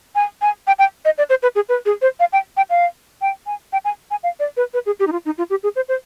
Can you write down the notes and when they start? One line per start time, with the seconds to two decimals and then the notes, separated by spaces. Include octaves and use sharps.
0.15 G#5
0.42 G#5
0.67 G5
0.79 G5
1.05 D#5
1.18 D5
1.29 C5
1.43 B4
1.55 G#4
1.69 B4
1.86 G#4
2.02 C5
2.20 F5
2.33 G5
2.57 G5
2.70 F5
3.21 G5
3.46 G#5
3.73 G5
3.85 G#5
4.11 G#5
4.23 F5
4.40 D5
4.57 B4
4.74 B4
4.86 G#4
4.99 G4
5.07 D#4
5.12 F4
5.25 D#4
5.38 F4
5.50 G4
5.63 G#4
5.76 C5
5.88 C5